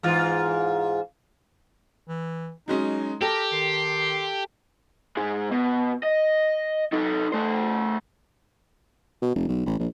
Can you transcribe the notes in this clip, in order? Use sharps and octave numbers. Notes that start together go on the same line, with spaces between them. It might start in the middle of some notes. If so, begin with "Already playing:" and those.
G#2 E3 F4
E3
F#3 G#3 C#4 D#4
G4 A4 A#4
D#3 C6
G#2 G#3
B2
D#5
D#4 A4
A3 C5
B2
F1
B1
A1
A#1